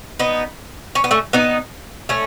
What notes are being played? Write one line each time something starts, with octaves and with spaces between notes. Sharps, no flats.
B3 D#4
C#4
B3
A3 C#4
B3 D#4
A3 C#4